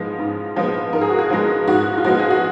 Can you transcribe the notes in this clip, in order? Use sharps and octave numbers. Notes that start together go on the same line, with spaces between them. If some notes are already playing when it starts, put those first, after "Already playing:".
Already playing: G#2 F3 G#3 B3
G#2
F3 G#3 B3
G#2 A#4
G#4
F#4
G#4
F3 G#3 B3
G#2 F#4
F4
F3 G#3 B3 F#4
G#4
F#4